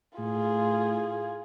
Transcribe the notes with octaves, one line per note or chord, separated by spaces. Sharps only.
A2 F4 G#4